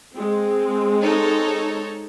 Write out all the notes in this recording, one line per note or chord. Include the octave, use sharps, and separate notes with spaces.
G#3 C4
D#4 A4 C#5